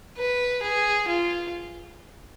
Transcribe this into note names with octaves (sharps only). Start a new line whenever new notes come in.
B4
G#4
F4